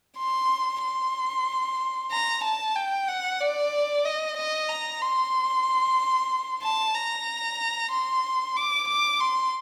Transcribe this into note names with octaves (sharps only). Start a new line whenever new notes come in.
C6
C6
A#5
A5
G5
F#5
D5
D#5
D#5
A#5
C6
A5
A#5
C6
D6
D6
C6